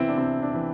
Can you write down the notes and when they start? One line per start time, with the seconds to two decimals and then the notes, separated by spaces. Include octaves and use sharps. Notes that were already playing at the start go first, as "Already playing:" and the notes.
Already playing: C3 E3 B3 C4 E4
0.08 D4
0.17 C3 C4
0.42 D4
0.54 E3